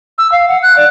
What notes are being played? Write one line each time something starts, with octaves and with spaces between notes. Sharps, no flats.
E6
F5
F#5
F#6
D5